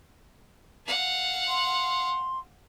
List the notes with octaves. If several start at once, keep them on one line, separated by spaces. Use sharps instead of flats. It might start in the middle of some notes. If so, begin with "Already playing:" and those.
F5 F#5
C6